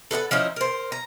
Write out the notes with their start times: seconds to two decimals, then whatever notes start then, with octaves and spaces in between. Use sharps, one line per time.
0.11 A4 B4 D#5 F#5
0.31 F3 C#4 D#4 E4
0.56 A#4 C5
0.92 A#5